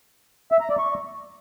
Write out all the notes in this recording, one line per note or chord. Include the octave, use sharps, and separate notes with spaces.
E5
A#5
D5
C#6